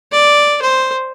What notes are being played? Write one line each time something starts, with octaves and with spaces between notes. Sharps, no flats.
D5
C5